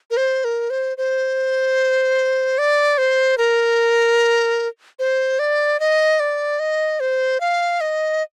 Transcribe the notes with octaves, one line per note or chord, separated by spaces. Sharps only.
A#4
C5
A#4
C5
C5
D5
C5
A#4
C5
D5
D#5
D5
D#5
C5
F5
D#5